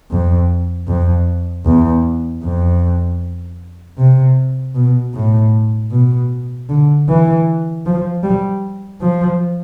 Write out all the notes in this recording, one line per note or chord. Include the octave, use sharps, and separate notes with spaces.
F2
F2
E2
F2
C3
B2
A2
B2
D3
E3
F3
G3
F3